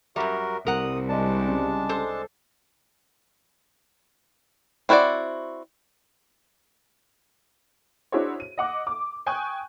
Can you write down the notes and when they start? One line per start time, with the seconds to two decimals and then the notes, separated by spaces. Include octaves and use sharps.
0.16 F#2 G3 F#4 A#4 E5
0.67 C2 A#4 F#5 D#6
1.09 G#3 D4 D5 D#5 A5
1.48 C#3 G3
1.89 A4 C5
4.89 C4 E4 F#4 B4 D5
8.12 D4 E4 F#4 G#4 C5 C#5
8.40 D#7
8.58 D#5 F#5 D6
8.87 D6
9.26 G5 G#5 C#6 D#6 F#6 G6